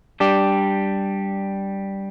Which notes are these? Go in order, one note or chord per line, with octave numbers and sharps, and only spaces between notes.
G3 D4 G4